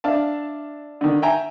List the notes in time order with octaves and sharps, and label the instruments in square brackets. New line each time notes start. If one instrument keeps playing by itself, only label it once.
[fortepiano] D4 E5 F5 A5
D3 D#3
E5 G5 G#5 A#5